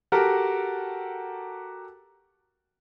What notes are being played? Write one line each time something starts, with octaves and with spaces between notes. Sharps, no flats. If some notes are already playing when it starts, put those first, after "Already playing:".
F#4 G4 A4 A#4